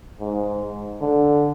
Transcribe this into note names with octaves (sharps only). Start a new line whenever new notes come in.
G#2
D3